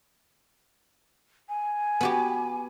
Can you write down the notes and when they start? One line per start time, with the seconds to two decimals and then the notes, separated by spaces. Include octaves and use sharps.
1.49 G#5
2.01 B3 F#4 G4